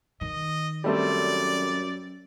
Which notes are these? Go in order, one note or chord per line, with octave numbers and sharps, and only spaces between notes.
D#3 D#5
F#2 G3 A3 C4 D5